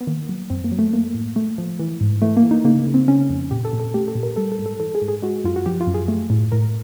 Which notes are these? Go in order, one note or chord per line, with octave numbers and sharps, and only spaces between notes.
B3
D#3 A#3
F#3
F#2 C4
A#3
F#3
A3
A3 A#3
A2
A3
F3
E3
G#2
E3 A3
A#3
E3
D#4
C#3 A#3
C#3
C4
C#3 C#4
F2
A#2 G4
A4
A#2
A4
A3 G4
A4
A#2
A#4
G3 A4
A4
G#2
A4
E3 A4
G#4
G#2
G#4
G#3 F#4
F#2 F4
F#4
F3 G4
F4
F#2
G#4
A3
A2
A2 A#4